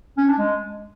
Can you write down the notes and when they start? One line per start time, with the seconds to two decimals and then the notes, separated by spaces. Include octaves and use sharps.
0.17 C#4
0.28 D4
0.38 G#3